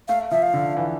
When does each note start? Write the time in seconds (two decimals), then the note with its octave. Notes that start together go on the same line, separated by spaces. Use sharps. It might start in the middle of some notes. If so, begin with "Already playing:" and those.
0.08 A3 F5
0.31 F3 E5
0.42 F5
0.53 D3
0.77 E3